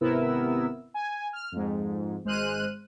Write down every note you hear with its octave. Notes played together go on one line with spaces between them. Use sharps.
G#1 C3 B3 E4 A#4 E6
G#5
F6
F2 G#2
G#1 G#3 C5 F6 F#6 D#7